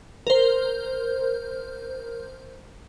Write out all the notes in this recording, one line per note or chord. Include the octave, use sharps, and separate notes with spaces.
A#4 C5